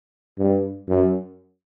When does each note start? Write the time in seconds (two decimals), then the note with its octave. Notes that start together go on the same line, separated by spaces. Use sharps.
0.38 G2
0.89 F#2